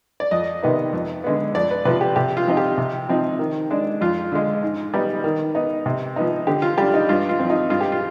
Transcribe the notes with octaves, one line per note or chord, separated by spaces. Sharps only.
D5
F2 D#5
C3 D#3 B3 D#4
F2
D3 G#3 B3
F2 D5
B4
C3 F3 B4
G4
C3 G4
F4
F3 C4 D#4
G4
C3
F3 C4 D#4
D#3
G#3 D4
F2 F4
D3 G#3
G#2
G3 B3 D#4
D#3
B3 D#4
C3
F3 B3 D#4
D3 G4
F4
G3 D4 G4
D#4
G2 F4
F4
F3 C4
D#4
G2 F4
G4
F4